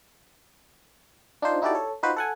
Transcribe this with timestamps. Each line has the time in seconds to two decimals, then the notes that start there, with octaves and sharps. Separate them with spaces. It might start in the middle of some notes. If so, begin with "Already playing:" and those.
1.42 D4 D#4 F4 C5
1.62 D#4 E4 F#4 G4 A4 D5
1.75 A4 C#5
2.03 D#4 F4 F#4 B4 C5
2.17 A4 F#5 G#5